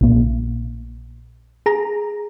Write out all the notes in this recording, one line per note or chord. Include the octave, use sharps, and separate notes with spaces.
A#1 A#2
G#4 A#5